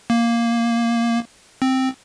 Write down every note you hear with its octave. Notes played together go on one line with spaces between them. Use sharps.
A#3
C4